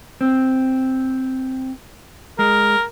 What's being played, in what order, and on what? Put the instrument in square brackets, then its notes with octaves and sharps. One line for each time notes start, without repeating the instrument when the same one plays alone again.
[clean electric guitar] C4
[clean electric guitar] G#3 [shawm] A#4